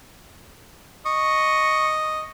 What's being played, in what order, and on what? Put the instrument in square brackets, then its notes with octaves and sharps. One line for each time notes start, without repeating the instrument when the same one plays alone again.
[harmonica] D#5 [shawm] C#6